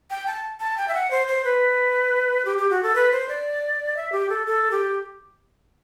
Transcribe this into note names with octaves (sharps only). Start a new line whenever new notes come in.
G5
A5
A5
G5
E5
F#5
C5
C5
B4
G4
G4
F#4
A4
B4
C5
D5
E5
G4
A4
A4
G4